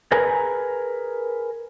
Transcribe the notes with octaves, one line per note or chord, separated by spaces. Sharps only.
G#4 A#4 B4 G#5 A#5